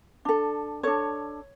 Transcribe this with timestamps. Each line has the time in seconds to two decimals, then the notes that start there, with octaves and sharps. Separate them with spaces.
0.25 D4 A4
0.83 D4 A4 C#5